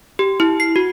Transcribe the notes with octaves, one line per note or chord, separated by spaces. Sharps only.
G4
E4
C7
F#4